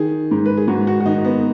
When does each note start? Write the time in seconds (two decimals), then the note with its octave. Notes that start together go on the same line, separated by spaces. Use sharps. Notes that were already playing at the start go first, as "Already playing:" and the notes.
Already playing: D#3 G#4
0.31 G#2
0.46 B4
0.57 G#4
0.68 G#2 F#4
0.87 F#4
1.00 F#4
1.05 D#3 D#4
1.25 B3